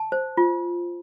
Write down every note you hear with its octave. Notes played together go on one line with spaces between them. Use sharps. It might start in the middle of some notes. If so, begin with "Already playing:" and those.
Already playing: A5
C5
F4